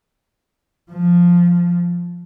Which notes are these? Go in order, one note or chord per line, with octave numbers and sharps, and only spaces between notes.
F3